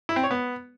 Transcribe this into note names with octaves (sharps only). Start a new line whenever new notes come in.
E4
C4
C#5
B3